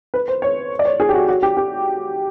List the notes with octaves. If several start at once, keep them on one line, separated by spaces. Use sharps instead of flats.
B4
C5
C#5
D5
C#5
G#4
G4
F#4
F#4
G4
G4